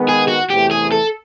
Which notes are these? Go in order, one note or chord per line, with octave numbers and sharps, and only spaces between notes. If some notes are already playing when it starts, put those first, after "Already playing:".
Already playing: D#3 G#3 B3
G#4
F#4
E2 C3 E3 A3 G4
G#4
A4